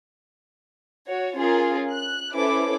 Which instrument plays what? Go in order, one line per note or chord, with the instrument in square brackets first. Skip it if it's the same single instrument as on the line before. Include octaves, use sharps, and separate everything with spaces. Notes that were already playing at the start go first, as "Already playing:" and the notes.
[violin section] F#4 C#5
C#4 F4 G#4 A#4
F#6
C#4 E4 A4 B4 C5 D6